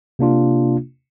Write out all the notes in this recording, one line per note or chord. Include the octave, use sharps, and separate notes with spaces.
C3 A#3 D4 F4